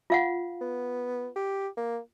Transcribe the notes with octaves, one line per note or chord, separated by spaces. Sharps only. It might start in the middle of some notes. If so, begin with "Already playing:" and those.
F4 F5 F#5
B3
G4
A#3